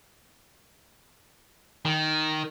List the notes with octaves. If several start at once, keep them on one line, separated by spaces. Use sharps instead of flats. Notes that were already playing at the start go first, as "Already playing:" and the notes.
D#3